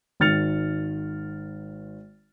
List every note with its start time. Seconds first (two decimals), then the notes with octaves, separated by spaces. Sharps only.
0.20 G#1 D#3 F6 A6 C#7 F7